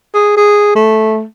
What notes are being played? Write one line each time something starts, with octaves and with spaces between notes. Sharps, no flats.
G#4
G#4
A3